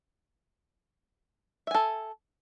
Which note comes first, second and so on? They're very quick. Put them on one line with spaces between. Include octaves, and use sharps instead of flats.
E5 G#5 A4